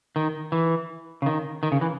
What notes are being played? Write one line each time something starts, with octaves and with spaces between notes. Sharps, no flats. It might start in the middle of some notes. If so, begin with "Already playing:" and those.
D#3
E3
C#3
D#3
D#3
C#3
E3